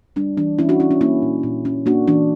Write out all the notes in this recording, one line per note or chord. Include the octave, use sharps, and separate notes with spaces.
G3 D4
E3 D4
E3 C#4 E4
D4 F#4
C#4 E4
C#4
A#3 C#4 E4
A#2
A#2
C#4
A#3 D4 F#4
E3 D4